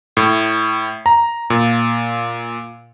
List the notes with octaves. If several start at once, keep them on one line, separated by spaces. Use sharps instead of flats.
A2
A#5
A#2